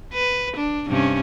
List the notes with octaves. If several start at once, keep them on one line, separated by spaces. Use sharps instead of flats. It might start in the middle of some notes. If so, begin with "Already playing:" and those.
B4
D4
G2 C3 C#4